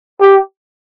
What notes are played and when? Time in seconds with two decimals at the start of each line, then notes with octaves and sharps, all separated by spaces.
0.21 G4